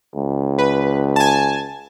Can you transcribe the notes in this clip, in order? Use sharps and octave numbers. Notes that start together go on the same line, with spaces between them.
C#2
B4
G#5 A5